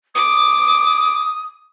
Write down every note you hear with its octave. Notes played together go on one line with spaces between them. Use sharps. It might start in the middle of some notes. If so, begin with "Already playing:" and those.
D6 D#6